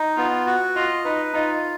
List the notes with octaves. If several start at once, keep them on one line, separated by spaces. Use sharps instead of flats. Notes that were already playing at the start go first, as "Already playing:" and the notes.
Already playing: D#4
B3 F4
F#4
F4 D#5
D#4 B4
D#4 F4